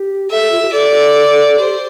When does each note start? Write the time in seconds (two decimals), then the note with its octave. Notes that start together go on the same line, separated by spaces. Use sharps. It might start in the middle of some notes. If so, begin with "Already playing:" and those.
Already playing: G4
0.30 A4 E5
0.41 A4
0.51 F4
0.62 G4
0.72 A4 D5
1.58 G4 C5